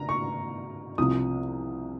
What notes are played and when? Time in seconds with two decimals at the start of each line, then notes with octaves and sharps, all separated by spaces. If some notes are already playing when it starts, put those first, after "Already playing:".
Already playing: A#5
0.09 C#6
0.98 C2 C3 F3 D#6